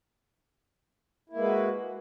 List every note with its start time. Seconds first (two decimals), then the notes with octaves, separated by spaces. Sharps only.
1.30 E4
1.33 A#3
1.36 G#3
1.40 B4
1.43 F#4